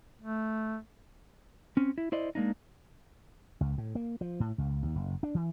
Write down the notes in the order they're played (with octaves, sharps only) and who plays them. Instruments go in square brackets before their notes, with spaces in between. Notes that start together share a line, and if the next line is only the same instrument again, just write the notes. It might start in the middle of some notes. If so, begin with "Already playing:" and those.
[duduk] A3
[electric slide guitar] C4 C#4
E4
E4 C5 D5 D#5
G#3 A#3 D4 D#4
[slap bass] C#2
A2
A#3
F3
A2
C#2
D#2
F#1
D4
E3